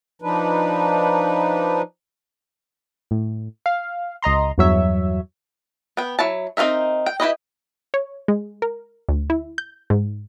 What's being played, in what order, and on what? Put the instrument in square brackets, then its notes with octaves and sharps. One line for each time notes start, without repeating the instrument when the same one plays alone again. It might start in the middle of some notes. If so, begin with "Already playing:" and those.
[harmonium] F3 D4 D#4 B4
[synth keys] A2
F5
C#2 D#5 A#5 C6
E2 G2 F#3 C#5 E5
[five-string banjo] B3 G5
F#3 E4 A5
C4 D#4 F#4 A#4 E5
G5
E4 G4 B4 D#5
[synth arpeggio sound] C#5
G#3
A#4
D2
E4
G6
G#2